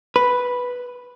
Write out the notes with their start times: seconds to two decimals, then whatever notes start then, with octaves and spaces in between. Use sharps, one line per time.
0.16 B4